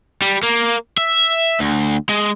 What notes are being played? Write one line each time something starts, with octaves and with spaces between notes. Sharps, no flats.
G3
A#3
E5
D2
G#3